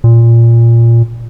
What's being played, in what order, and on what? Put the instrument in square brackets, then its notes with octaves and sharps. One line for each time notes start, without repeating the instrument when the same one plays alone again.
[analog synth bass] A#2